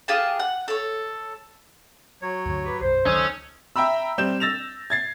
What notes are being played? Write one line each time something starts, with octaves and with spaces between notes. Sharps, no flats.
F4 G4 G#4 A5
F#5
A4 C#5
F#3 C#5
D2 G2 D3
G4 B4
B1 F#2 C5
C#2 D#3 F#3 C#4 D#4 A4 D#6
E5 G5 A#5 B5 E6
G3 C4 G6 E7
E6 A6 A#6 E7 F7
G#6 A6 C7